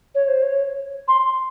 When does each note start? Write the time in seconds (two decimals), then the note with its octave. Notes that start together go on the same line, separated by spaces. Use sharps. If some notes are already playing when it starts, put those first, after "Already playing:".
0.15 C#5
0.28 C5
0.42 C#5
1.08 C6